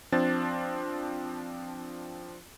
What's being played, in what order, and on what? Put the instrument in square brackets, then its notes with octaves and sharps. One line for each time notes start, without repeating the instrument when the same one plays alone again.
[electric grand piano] F3 C4 D4 A6